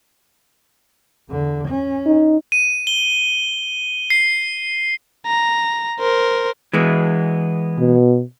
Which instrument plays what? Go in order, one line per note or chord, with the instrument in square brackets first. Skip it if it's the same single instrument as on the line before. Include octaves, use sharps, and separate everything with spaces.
[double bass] E2 D3
C#4
[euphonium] D#4
[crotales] D#7
G7
C7
[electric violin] A#5
A#4 C5
[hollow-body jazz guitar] E3 G#3 B3
[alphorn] B2